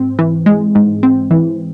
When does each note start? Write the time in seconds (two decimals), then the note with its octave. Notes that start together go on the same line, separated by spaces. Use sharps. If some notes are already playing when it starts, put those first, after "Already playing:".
Already playing: G#2 C4
0.19 E3
0.46 G#3
0.75 G#2
1.03 C4
1.31 E3